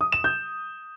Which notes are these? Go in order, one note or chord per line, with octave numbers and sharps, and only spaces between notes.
D#6
E7
G6